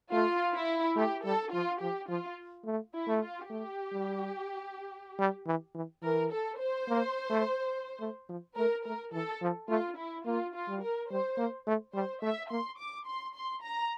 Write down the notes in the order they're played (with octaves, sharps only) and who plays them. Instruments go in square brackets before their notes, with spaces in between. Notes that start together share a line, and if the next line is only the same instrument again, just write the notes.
[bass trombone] A3 [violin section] F4
[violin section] E4
[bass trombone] A3 [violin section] G4
[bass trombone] G3 [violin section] A4
[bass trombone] F3 [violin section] F4
[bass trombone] F3 [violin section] G4
[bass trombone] F3 [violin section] F4
[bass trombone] A3
[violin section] E4
[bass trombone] A3
[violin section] F4
[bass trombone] A3 [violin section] G4
[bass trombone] G3
G3
E3
E3
[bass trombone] E3 [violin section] A#4
[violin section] A4
C5
[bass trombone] A#3
A3
A3
F3
[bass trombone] A3 [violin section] A#4
[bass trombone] A3 [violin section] A#4
[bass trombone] E3 [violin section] A4
[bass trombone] F3
[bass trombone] A3 [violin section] F4
[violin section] E4
[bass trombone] A#3 [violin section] F4
[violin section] F4
[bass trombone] G3
[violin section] A#4
[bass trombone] G3 [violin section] C5
[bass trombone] A#3
A3
[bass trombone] G3 [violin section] C5
[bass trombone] A3 [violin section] E5
[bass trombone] A#3 [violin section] C6
[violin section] D6
C6
C6
A#5